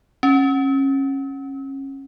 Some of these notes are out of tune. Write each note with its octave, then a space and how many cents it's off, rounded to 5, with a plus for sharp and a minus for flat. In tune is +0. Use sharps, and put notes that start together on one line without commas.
C#4 -25